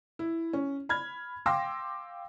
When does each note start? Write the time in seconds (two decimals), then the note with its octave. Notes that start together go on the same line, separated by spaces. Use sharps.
0.19 E4
0.53 C#4
0.89 B5 F6 G#6
1.46 F5 G5 C6 D6 E6 A#6